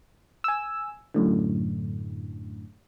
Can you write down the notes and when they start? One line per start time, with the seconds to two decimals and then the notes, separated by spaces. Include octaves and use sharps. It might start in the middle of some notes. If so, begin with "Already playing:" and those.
0.44 G#5 E6
1.14 F#2 A2 D3